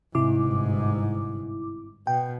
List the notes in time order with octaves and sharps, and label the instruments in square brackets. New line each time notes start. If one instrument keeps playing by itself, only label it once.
[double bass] G1 G#2 [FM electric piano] C3 E4 D6
[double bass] B2 [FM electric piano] G5